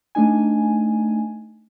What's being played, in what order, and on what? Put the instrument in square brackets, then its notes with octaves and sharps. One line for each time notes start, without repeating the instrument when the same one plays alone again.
[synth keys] A3 D4 D#4 G#5